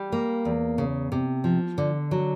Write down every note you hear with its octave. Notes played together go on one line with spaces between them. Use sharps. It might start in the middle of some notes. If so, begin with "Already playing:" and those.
Already playing: G3
A#3
E2
C#3
C3
F3
D3
F#3